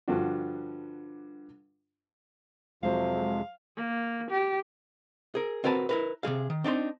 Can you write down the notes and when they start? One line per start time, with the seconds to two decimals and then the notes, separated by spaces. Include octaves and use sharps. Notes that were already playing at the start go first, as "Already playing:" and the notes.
0.08 G2 D3 F3 D4 F4 F#4
2.83 F2 C3 F3 F#3 G#3 C5 F5
3.76 A#3
4.30 G4
5.35 G#4 A#4
5.64 C4 F#4 A#4 B4 G#5 A5
5.89 E4 A#4 B4
6.23 C3 F#3 G#4 F5
6.50 D#3
6.64 C4 D4 D#4 C6